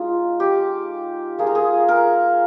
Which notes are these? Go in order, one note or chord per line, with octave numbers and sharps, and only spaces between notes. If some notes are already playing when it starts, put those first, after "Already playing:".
Already playing: G#3 D#4 F4
G4
A#3 F4 G#4
A#4
G#4
A#4